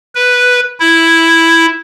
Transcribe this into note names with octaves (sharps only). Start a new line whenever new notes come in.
B4
E4